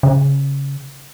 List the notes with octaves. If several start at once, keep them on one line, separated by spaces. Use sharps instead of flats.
C#3